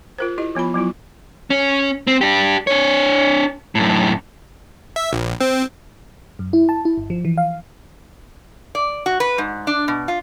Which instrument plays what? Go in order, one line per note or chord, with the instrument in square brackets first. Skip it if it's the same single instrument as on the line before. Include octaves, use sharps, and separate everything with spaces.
[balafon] F4 A#4 C5
E4 G4 D#5
F3 B3 F4 B5
F#3 B3 E4 F4
[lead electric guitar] C#4
C4
D4 G4
D4 C#5
F#2 A2
[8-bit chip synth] E5
A#1
C4
[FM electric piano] F#2
E4
A5
E4
G1
F3
E3
F5
[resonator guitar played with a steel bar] D5
F#4
B4
G#2
D4
B2
F4